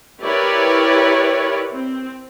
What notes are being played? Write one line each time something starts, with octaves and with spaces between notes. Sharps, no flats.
E4 G4 A#4 B4 C#5 D5
C4